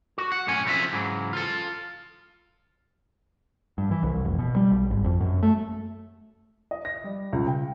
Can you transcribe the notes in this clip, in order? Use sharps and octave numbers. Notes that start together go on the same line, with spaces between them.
F#4
F#5
B1 F#2 A2 C#5 G#5
C#3 F3 C4 D4 E5
G#2 C#3 E3 F#3
F4 A4
G2
E3
C2
F1
B2
G3
B1
G#1
F2
F#2
A3
D#5
A#6
G3
C#2
G5